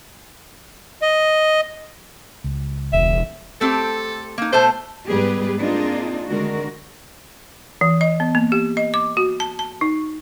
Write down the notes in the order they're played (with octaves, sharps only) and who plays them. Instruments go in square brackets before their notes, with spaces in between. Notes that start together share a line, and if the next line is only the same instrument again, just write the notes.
[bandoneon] D#5
[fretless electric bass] C#2
[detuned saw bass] E1 [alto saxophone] E5
[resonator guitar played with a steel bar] A3 C4 G4 [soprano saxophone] A4
[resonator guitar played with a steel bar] A#3 D#4
[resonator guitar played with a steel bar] B2 A3 A5 [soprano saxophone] C5
[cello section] G#2 G3 B3 G4 G#4 B4
A#3 C4 D4 D#4 F4 G#4
D3 D#3 G#3 D4 F#4 A#4
[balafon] E3
D#5
B3
A#3
G4
D#5
D6
F#4
A5
A5
D#4